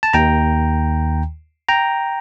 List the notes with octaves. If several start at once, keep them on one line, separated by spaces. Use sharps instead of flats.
A5
D#2 D#3 G5 A#5
G5 A#5